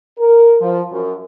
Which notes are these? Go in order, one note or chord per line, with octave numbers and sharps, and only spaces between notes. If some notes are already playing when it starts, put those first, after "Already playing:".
A#4
F3
F#2